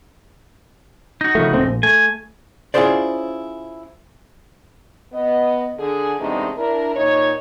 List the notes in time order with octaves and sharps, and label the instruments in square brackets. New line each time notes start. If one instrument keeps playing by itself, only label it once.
[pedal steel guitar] D#4 F#4
[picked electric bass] C#3 F3 A3
D#1 A3 C4
A#1
[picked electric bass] A3 [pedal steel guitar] G#5
[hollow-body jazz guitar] C#4 E4 F4 G#4 C5 D5
[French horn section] B3 D#5
D3 G#4
E2 C3 G#3 A3 D4 D#4
D4 E4 A#4
A#2 D#4 C#5